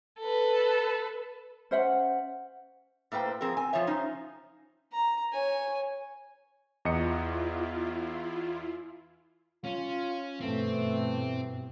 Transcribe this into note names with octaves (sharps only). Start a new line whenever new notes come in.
A4 B4
C#4 C5 E5 F#5
A2 A#3 B4 C5 G5
F3 C4 G#4 A#4
C4 G#5
F3 F4 C5 C#5 E5
C#4 D#4 C5
A#5
C#5 G#5
E2 E4 F4 D#5 C#7
C#4 F4
G2 B2 E3 A3 C4